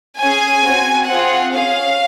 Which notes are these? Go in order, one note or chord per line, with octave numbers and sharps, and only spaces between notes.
C#4 G#4 G#5
C4 F#4
C4 F4 G#4 F#5
C#4 G#4 F5